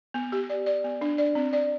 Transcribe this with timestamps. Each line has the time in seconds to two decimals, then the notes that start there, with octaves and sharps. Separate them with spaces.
0.14 B3
0.32 G4
0.50 D5
0.66 D5
0.84 B3
1.01 D4
1.18 D5
1.35 C4
1.53 D5